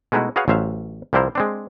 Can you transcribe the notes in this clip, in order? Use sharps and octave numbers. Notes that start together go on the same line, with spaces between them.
B2 G#3 A3 D#4 E4 F#4
F#4 G#4 B4 C#5 F5 F#5
A1 F#3 C5 E5 F5
C2 F3 G3 E4 C5 A#5
G#3 C4 D4